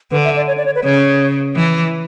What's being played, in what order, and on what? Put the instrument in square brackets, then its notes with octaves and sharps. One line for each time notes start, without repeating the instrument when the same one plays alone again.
[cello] D3 [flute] B4
[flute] E5
D5
C#5
D5
C#5
B4
[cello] C#3 [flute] C#5
[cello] E3